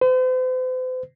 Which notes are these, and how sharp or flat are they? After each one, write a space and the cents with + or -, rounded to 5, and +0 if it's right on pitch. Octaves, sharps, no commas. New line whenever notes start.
C5 -45